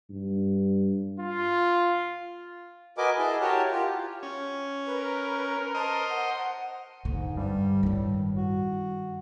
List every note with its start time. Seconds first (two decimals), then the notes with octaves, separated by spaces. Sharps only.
0.10 G2
1.20 F4
2.98 F#4 A#4 B4 D#5 G#5 D6
3.18 E4 G#4 D#5 G#5 A5
3.41 F#4 G4 A#4 C#5 A5
3.72 F4 G4
4.23 C#4
4.86 A#4 B4
5.74 C5 D#5 A5
6.09 F#5
7.05 G#2 D3
7.37 G2 G3
7.83 A2 D#3 G3
8.37 F#4